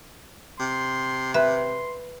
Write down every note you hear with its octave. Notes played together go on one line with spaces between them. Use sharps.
C3 C6
B4 E5 C6